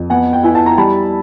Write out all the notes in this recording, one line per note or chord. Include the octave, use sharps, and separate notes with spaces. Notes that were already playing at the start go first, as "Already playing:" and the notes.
Already playing: F2
B3 F#5 G#5
G5
E4 G#5
A5
A#5
G3 A5 B5